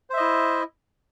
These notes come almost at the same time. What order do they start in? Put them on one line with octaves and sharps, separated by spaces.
C5 E5 D#5 E4